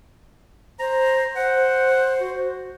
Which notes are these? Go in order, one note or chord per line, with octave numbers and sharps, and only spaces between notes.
C5 A#5
C5 F#5
F#4